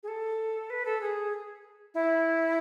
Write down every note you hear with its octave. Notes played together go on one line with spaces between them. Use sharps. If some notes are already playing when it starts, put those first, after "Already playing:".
G#4
A4
B4
A4
G#4
E4